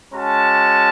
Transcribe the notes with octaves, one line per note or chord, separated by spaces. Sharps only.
G#3 C#4 F#4 A5